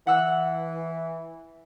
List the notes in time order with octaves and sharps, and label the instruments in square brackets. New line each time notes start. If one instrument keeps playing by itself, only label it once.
[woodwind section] E3 [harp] F#5 E6 F#6